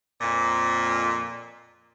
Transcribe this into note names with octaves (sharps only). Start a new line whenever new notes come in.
F2 A#2